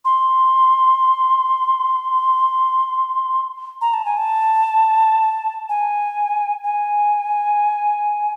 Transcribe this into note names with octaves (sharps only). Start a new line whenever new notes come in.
C6
A#5
A5
G#5
A5
G#5
G#5